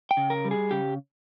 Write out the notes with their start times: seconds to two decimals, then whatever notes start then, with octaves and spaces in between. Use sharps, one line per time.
0.11 G5
0.17 C#3
0.30 A#4
0.45 G3
0.51 G#4
0.71 C#3 G4